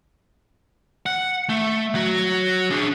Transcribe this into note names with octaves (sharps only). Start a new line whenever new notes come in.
F#5
A3
F#3 F#4
D4 G#4